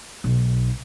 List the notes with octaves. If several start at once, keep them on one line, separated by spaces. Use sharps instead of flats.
B1